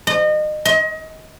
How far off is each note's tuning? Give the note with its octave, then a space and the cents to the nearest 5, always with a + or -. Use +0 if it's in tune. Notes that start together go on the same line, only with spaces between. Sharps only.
D#5 -30
D#5 +30